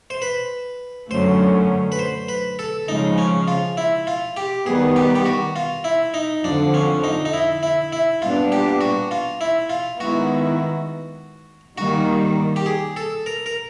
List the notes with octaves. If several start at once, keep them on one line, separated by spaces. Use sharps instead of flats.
C5
B4
F#2 D3 F#3 A3 C#4 C5
B4
C5
B4
A4
C#3 F3 G#3 D#4
C#4
F4
E4
F4
G4
D#3 G3 B3 G#4
G4
G4
F#4
F4
E4
D#4
F2 D3 F3 D4
C#4
D#4
D#4
E4
E4
E4
A#2 G3 B3 D4 F4
G4
F#4
F4
E4
F4
D#3 G#3 B3 E4 F#4
D#3 G3 A#3 F#4
G4
G#4
A4
A#4
A#4